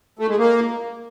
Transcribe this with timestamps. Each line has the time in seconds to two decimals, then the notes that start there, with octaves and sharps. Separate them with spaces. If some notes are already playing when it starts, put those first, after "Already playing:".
0.19 A3
0.29 G#3
0.39 A#3